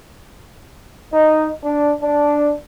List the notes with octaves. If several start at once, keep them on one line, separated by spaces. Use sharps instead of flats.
D#4
D4
D4